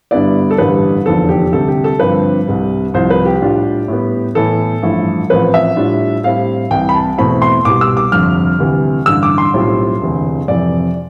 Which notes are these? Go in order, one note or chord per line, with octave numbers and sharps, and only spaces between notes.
G2 D3 G3 B3 E4 D5
A4
A1 G2 D3 G3 B4
F1 E2 D3 F3 B3 A4
G4
D2 C3 G3 A4
G4
A4
G2 D3 F3 C4 B4
C2 C3 G3
C2 C3 F3 C5
B4
G4
A2 G3 D4 F4
A2 G3 B3
A2 E3 B3 A4
A1 G2 F3 A3 E4
A1 A2 F3 C4 B4
E5
A2 G3 D4 F4
A2 G3 C4 E4 F5
C2 C3 E3 G5
B5
A5
E2 B2 A3 C4 E4 B5
C6
C2 B2 G3 D6
E6
D6
G1 F2 C3 F6
D2 C3 E3 G3
A1 G2 D3 E6
D6
C6
B1 A2 G3 C4 F4
E1 D2 C3 E3
F2 C3 E3 D5